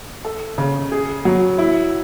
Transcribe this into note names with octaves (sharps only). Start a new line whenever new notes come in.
A4
C#3
G#4
F#3
E4